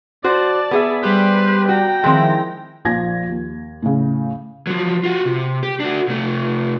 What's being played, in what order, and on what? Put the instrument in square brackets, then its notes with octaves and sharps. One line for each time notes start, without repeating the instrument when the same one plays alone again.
[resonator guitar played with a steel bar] F#4 C5 [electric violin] D5 A5
[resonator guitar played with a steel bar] B3 G#4 E5
[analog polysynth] G3 G4 [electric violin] B4 C5
[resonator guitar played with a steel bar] F#4 [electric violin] G5 A#5
[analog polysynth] D#3 F3 E4 [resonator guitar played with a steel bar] G#3 C4
[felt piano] A#1 F3 G#6 A#6
D#2
A2 C#3
[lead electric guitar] F3 F#3
F4 F#4
C3
G4
D4 F#4
C3 A3